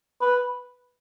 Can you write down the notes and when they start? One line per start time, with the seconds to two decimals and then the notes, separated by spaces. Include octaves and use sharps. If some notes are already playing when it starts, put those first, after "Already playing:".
0.22 B4